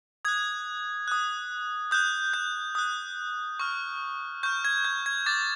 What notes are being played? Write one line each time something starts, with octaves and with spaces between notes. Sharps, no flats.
D#6 F#6 G#6
D#6 F#6
D#6 F#6 G6
G6
D#6 F#6
C#6 F6
C#6 F6 G6
G#6
G6
G#6
D6 G6 A6